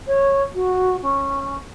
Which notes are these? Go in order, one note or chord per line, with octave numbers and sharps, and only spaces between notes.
C#5
F#4
C#4